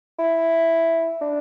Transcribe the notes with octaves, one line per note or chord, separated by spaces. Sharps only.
E4
D4